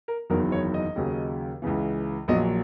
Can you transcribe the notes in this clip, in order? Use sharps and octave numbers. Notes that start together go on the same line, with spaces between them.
A#4
F#1 E2 D#3 F#3 A#4
C#5
D#5
D#2 C#3 F#3
C#2 C#3 E3
A#1 A#2 F#3 D#5